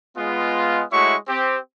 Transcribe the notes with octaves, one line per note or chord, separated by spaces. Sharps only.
G#3 B3 F4
G#3 A3 E4 F#4 C#5 C#6
C4 G4